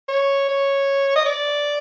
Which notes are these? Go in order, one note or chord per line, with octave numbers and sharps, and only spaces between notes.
C#5
C#5
D#5
D5